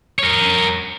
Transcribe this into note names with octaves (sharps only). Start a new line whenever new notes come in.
A#4 C#5